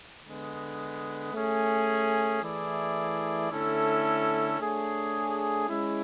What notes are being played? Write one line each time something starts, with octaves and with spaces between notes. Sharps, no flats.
D3 G#3 B3
A3 C#4 G#4
E3 A3 E4 G#4 D5
D3 A3 C#4 E4 A4
A3 D4 G#4 C#5
G#3 C#4 E4